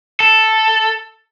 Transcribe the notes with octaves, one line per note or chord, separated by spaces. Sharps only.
A4